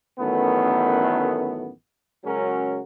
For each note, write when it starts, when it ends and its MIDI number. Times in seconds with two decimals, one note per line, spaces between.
0.19 1.70 33
0.19 1.70 42
0.19 1.70 51
0.19 1.70 57
0.19 1.70 59
2.24 2.80 49
2.24 2.80 54
2.24 2.80 56
2.24 2.80 61
2.24 2.80 66
2.24 2.80 70